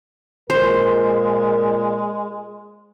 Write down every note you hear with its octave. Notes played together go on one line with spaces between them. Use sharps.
A#2 G#3 A#4 C5